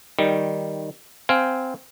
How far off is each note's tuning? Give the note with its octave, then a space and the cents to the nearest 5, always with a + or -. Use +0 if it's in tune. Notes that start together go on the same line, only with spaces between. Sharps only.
D#3 +0 G3 +0
C4 -10 F5 +0 G#5 +0